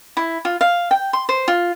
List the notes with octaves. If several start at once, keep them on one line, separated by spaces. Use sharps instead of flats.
E4
F4
F5
G5
C6
C5
F4